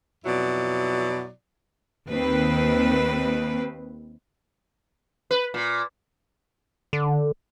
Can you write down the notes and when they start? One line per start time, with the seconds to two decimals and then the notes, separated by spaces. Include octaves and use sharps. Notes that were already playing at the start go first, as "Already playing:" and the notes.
0.25 F2 B2 F#3 E4 D5
2.10 D#2 D#3 C4 B4
5.31 B4
5.54 A#2
6.93 D3